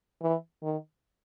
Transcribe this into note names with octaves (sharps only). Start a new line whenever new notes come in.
E3
D#3